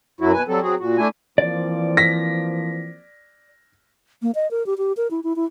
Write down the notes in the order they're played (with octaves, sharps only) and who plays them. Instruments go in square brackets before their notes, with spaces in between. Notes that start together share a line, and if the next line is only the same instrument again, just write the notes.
[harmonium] F#2 F#3 E4 F#4
B2 B4 G#5
F#3 G3 C4 A4
F#3 C4 F#4 G#4
A#2 F#4
A3 D4 E4 G#5
[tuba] E3 [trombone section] F3 A#3 C4 [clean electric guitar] D5
[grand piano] A#6 B6
[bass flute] A#3
D#5
A#4
G4
G4
A#4
E4
E4
E4